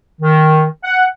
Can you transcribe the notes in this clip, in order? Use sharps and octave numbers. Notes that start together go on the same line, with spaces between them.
D#3
F#5